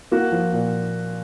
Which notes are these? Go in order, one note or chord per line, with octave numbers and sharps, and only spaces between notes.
A#3 F#4
F3
A#2